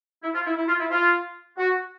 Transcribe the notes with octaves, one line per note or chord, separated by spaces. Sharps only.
E4
F4
E4
E4
F4
E4
F4
F#4